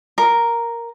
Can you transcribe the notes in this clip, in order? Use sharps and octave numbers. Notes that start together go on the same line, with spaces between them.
A#4